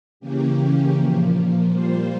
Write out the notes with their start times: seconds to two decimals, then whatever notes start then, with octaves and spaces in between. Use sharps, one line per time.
0.20 C#3 E3 A#3 C#4 G4
0.95 A#2 F3 A#3
1.70 A#2 G3 A#3 F4 C5